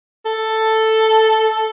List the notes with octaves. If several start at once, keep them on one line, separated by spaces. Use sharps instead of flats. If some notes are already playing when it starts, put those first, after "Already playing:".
A4